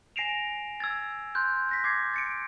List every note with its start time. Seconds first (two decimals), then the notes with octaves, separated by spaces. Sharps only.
0.16 G#5 A#6 C7 D7 E7 F7
0.80 E6 G#6 A6
1.35 C6 F#6 G6
1.69 G6 A#6 B6
1.84 D6 G#6 C7
2.14 A6 C#7 D7